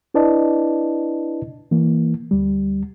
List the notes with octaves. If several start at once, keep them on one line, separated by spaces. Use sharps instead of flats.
D4 E4 B4 D5 D#5 A5
E3 A#3
D2 G3